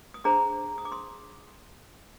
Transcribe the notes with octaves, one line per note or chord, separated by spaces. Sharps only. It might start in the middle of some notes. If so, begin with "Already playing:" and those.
D#6
D4 G#4 C5 A#5 D6
D#6
D6
C6 D#6